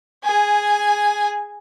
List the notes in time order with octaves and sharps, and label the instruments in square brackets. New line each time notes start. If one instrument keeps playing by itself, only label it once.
[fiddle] G#4 G#5